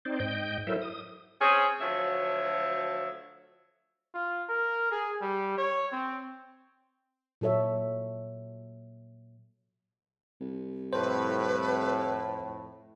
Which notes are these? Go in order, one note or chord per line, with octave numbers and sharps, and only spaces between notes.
C4 D#4 C5 D5
G#2 D#5 G5 G6
F#3 E4 A4 A#4 C5 E5
D#6
C4 C#4 G#4
D2 F3 F#3 C#5 E5
F4
A#4
G#4
G3
C#5
C4
A#2 F#3 A4 C#5 E5
C2
F2 A2 B4 C5